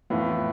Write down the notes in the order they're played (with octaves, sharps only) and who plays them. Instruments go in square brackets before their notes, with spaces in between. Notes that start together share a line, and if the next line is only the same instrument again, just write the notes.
[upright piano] F2 E3 B3 F4 B4 [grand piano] A2